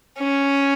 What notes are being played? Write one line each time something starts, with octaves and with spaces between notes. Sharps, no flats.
C#4